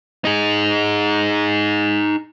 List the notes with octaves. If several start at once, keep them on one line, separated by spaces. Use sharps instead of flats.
D#4 G#4